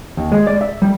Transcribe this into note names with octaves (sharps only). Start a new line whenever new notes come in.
D#2
G#3
D5
E5
G3